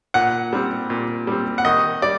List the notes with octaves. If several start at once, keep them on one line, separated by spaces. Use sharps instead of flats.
A#2 F#5
G3 C4
A#2
G3 C4
F#5
D#3 D#5
G3 D5